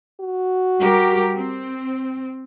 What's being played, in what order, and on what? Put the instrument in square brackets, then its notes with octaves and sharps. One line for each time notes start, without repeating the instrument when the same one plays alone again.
[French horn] F#4
[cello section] G3 G4 A#4
C4